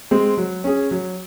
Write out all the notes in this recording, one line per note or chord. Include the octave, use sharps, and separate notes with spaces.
G#3 C4
F#3
C#4 G#4
F#3